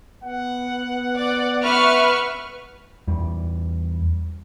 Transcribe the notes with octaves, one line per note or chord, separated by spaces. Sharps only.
B3 F#5
D5
B4 E5 C#6 F6
E2 G3